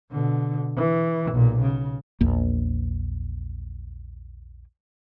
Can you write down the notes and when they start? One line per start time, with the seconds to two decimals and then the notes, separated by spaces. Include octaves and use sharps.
0.11 B2 D3
0.77 E3
1.32 B1 A#2
1.62 C#3
2.21 A#1 E2 A#3